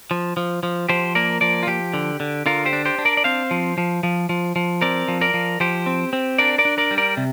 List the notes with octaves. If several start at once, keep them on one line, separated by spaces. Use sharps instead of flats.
F3
F3
F3
F3 G4 C5
A#3 A#4 D5
F3 A#4 D5
F4
F3 G4
D3
D3
D3 F4 A#4
G4 C5
D4
G4 C5
D4
A#4 D5
D5
C4 C5 F5
F3
F3
F3
F3
F3
C4 A#4 D5
F3
A#4 D5
F3
F3 G4 C5
C4
C4
D4 A#4 D5
A#4 D5
D4
A#4 D5
G3
A#4 D5
C3